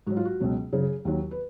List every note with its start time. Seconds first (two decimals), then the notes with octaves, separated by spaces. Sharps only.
0.07 G#2 F#3 F#4
0.17 F4
0.25 F#4
0.40 C#2 B2 F#3
0.73 F#2 C#3 F#3 G#4
1.05 D#2 D#3 F#3
1.31 B4